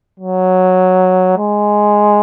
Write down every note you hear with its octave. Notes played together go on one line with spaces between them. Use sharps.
F#3
G#3